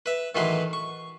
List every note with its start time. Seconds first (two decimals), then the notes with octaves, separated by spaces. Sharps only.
0.06 B4 E5
0.35 A2 D#3 E3 F#3 B4 C6
0.73 C#6